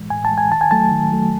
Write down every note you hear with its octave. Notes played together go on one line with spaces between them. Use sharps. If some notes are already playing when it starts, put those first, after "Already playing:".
Already playing: A2 E3 G#3
A2 G#5
A5
E3 G#3
G#5
D#3 A5
G#5
F#3 A3 A5
D#3
F#3 A3